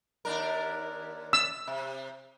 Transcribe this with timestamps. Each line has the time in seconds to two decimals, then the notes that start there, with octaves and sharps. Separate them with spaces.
0.25 D#2 D4 A#4
1.33 E6
1.67 C3